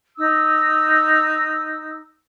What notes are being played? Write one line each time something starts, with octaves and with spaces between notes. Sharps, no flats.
D#4 D#6 E6